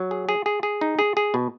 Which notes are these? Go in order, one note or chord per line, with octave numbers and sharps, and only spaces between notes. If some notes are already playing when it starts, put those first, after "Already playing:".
Already playing: F#3
G#4
G#4
G#4
G#4
D#4
G#4
G#4
B2